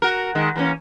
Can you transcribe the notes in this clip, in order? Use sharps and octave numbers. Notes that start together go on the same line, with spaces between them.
F#4 A#4
D#3 G#3
E3 A#3 C#4